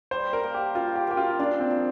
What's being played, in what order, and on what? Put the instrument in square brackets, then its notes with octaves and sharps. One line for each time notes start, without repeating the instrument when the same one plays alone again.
[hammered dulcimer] G3 [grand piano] C5
[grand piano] A#4
[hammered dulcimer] A#3
[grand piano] G4
[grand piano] F4 [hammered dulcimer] A#4
[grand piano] G4
[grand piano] G4 [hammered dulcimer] A#4
[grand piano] F4
[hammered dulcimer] A#2 [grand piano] D4
[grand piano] C4
[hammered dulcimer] F3